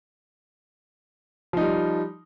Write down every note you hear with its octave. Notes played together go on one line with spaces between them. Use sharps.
F3 G3 D#4